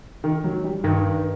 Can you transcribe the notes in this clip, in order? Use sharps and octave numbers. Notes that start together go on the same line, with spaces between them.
D#3
F#3
G3
G2 D#3